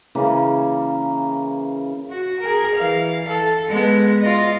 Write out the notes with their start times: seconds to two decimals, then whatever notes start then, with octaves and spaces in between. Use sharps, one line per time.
0.15 C#3 E3 A#3 C#4
2.09 F#4
2.40 G#4 A#4
2.75 E3 F5
3.28 A4
3.68 G#3 B3
4.21 F4 D#5